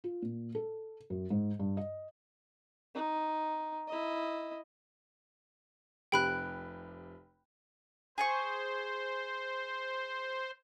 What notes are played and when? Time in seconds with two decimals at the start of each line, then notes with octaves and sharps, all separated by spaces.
0.04 F4
0.22 A#2
0.55 A4
1.10 F#2
1.30 G#2
1.59 G2
1.77 D#5
2.95 D#4
3.88 E4 D#5
6.12 F1 C3 G4 G5 B5 F#6
8.18 G#4 C5 G#5 C#6